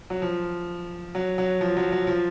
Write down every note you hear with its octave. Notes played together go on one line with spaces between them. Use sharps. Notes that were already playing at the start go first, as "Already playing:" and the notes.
F#3
F3
F#3
F#3
F3
F#3
F#3
F3